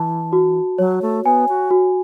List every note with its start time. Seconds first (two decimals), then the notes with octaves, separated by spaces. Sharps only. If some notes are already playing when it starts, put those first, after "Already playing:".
Already playing: E3 A5
0.33 F#4
0.78 F#3 C#5
1.02 A3
1.24 B3 G#5
1.48 F#4
1.71 F#4